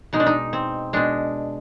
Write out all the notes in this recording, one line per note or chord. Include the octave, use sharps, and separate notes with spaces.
B2 G#3 D#4
D4
D#4
C4
B2 G#3 D4